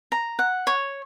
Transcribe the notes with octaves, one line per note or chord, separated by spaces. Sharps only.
A#5
F#5
C#5